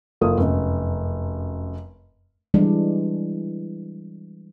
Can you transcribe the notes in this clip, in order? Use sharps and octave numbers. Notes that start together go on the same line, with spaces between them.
F#1 A#3 F4 A4 D#6
F1 F#2
E3 G3 G#3 D4